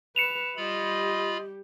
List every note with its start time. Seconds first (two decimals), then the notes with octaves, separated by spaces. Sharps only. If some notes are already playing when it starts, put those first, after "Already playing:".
0.16 B4 C#7 E7 F7
0.57 G3 F4 G4 D#5 B5